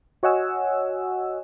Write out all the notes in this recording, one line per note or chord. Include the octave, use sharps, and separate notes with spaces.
F#4 C#5 D#5 F#5 G#5 E6